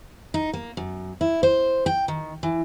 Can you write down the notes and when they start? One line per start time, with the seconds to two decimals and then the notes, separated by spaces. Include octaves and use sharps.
0.34 D#4
0.53 A#3
0.77 F#2
1.21 E4
1.43 C5
1.86 G5
2.08 D#3
2.43 E3